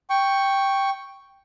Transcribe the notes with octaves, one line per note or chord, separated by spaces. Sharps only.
G5 C#6